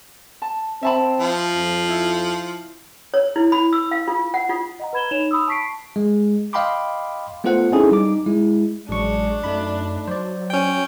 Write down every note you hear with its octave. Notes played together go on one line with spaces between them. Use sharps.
A5
C4 E5 A5 B5
F3
F2
E4
C#5
E4
B5
E6
F5
F4
F#5
F4
D#5 F#5 A#5
B4 B5 G#6 E7 G7
D#4 C#5 E7 F7
B5 D#6 E6
A5 C#6 B6 C7 D7
G#3
D#5 F5 G5 B5 C6 D6
A3 B3 F4 A4 C5 F#5
C4 C#4 D#4 E4 G#4 A4
G3 D#4 D6
G#3 E4
A1 F#3 G#3 D4 C#6
F#2 A3 D#4 B5
F#3 C5 D5
C#4 G5